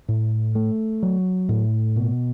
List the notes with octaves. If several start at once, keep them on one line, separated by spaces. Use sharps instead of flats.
A2
A3
F#3
A2
B2